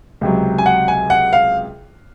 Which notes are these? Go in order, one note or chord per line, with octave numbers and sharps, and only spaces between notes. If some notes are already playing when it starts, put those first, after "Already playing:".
C#2 C3 F#3
G#5
F#5
G#5
F#5
F5